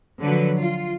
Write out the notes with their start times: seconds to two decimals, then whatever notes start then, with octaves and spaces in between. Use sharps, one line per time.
0.22 D3 F3 F#3 B4
0.59 F4